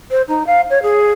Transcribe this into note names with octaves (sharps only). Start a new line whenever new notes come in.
C5
D#4
F5
C#5
G#4